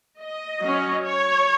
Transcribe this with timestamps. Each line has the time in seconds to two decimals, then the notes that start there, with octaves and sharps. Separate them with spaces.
0.19 D#5
0.63 F#3 C#4
1.04 C#5